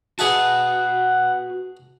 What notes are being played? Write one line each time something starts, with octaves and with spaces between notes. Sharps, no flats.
F#4 G#4 B4 E5 F#5 A5